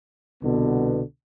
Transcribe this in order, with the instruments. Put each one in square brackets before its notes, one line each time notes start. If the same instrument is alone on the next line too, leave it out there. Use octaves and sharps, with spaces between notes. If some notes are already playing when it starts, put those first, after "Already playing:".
[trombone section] C2 B2 D3 B3